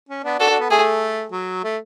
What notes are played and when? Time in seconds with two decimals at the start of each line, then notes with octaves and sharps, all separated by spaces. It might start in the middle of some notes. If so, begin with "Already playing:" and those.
0.09 C#4
0.23 B3 D4
0.39 D4 F#4 A4
0.49 D4 F#4
0.59 B3
0.70 A3 G#4
1.32 F#3
1.63 A3